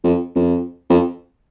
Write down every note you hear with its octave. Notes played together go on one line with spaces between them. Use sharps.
F2
F2
F2